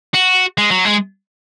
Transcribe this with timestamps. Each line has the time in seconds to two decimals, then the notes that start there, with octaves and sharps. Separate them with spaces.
0.14 F#4
0.58 G#3
0.71 F#3
0.85 G#3